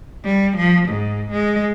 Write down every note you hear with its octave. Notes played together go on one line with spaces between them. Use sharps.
G3
F3
G#2
G#3